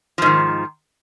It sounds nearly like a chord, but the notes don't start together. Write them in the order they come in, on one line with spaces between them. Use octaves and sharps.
F3 G#2 D#3